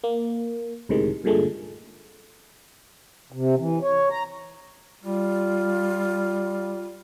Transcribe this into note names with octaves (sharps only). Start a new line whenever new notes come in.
A#3
C#2 A2 C3 D#3 G#3
G2 A#2 D3 G#3 A3
C3
E3
C#5
A#5
G3 F4